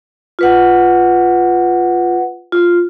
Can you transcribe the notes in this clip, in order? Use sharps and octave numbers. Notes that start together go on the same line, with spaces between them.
F4 B4 F#5
F4